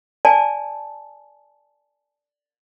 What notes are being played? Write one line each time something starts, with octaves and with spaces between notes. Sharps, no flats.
D5 G#5 A5